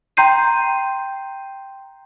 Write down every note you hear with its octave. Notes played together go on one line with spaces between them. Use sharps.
G5 A#5 C6 G6 C7 D#7